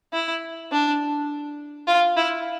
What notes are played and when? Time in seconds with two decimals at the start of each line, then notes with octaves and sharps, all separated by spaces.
0.13 E4
0.72 D4
1.88 F4
2.17 E4